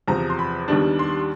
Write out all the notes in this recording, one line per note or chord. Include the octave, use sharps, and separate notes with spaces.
E2 C3 F3 A#5
C6
B5
D#2 D#3 G3 B3 D4
C6